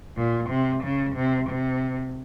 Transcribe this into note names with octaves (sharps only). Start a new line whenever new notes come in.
A#2
C3
C#3
C3
C3